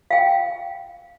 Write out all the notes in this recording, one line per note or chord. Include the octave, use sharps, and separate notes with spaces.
F5 G5